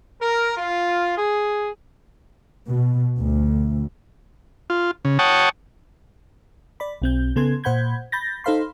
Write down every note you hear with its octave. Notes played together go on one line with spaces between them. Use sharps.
A#4
F4
G#4
B2
D2
F4
C#3
C#5 F#5 G5 A5 C#6 D#6
D5 B5
B1 C4 G6
C#3 B3 A4 C6 G#6
A#2 C5 F#5 B5 G6 G#6
B5 G6 A6 A#6
D#4 A4 C5 F5 B5 C6